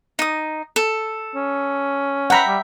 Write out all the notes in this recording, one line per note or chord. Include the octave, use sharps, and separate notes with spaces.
D#4 D#6
A4
C#4
E5 F#5 G5 A#5 B5
G3